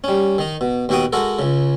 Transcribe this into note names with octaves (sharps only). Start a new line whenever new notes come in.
G3 C#4
D#3 D#4
B2
D#2 B2 F#4 F#5 G5 D#6
G#3 F#4 A4 A#4
C#2 C#3